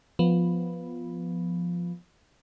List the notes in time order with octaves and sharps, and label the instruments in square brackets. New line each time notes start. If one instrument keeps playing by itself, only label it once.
[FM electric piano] F3 B3